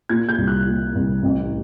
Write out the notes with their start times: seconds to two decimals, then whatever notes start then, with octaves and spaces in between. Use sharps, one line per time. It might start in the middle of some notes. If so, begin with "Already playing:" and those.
0.09 A#2 G#6
0.29 G6
0.38 C2
0.47 F#6
0.66 A#2
0.95 C2
1.23 A1